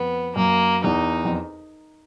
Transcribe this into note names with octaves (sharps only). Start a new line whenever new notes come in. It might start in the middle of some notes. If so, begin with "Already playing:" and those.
Already playing: F2 B3
F#2 A#3
E2 D#4
F2